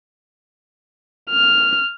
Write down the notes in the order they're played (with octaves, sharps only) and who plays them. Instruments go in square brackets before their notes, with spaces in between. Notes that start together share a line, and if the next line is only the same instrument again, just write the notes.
[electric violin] F6